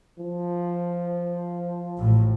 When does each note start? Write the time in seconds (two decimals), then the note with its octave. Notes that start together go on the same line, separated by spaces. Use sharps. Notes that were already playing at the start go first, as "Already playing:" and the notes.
0.20 F3
1.96 A1 A2